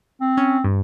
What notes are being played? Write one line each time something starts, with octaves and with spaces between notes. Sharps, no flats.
C4
C#4
G2